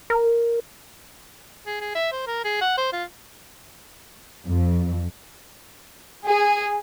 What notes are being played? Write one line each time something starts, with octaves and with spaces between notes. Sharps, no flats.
A#4
G#4
G#4
E5
C5
A#4
G#4
F#5
C5
F4
F2
G#4